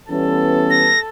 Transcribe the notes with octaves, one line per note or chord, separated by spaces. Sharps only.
E3 G3 B3 C#4 A4
A#6